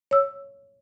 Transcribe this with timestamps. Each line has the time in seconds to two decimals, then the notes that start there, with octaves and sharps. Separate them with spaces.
0.11 C#5 E6